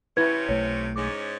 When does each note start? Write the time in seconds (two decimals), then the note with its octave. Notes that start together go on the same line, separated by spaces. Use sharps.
0.17 C3 C#4 E4 B4 G#6
0.49 B1 A3 C#5
0.96 G#2 C#4 D6